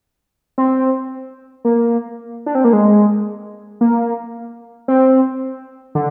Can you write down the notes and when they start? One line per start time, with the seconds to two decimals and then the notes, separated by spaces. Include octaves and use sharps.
0.58 C4
1.65 A#3
2.46 D4
2.55 C4
2.64 A#3
2.73 G#3
3.81 A#3
4.88 C4
5.95 D3